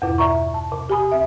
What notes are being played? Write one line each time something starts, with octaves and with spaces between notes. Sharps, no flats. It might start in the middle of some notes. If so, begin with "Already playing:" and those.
E2 G2 B2 E4 B4 D6
D5 E5 A#5 C#6
A5
C3
G4 G#5 B5 D#6
D2 E5